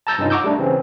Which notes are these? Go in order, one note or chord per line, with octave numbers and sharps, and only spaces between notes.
A5 A#5 E6 G6 A6 A#6
G2 C3 C#4 D#4 F4
F#5 A#5 C#6 D6 E6 G6
G3 A3 D4 A4
C#3 E3 C4 C#4